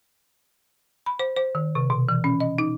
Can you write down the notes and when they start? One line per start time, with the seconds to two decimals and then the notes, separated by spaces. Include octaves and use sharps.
1.06 B5
1.19 C5
1.37 C5
1.55 D#3
1.75 C3
1.90 B2
2.09 E3
2.24 C#4
2.40 D#5
2.58 D#4